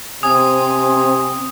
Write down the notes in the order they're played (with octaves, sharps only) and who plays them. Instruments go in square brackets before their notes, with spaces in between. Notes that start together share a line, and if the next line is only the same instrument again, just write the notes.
[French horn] C3 [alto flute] C4 [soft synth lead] G#5 [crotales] D#6